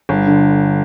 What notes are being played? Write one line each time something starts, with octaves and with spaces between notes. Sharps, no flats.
G1
D3